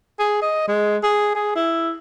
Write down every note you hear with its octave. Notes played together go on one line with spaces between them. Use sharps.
G#4
D#5
G#3
G#4
G#4
E4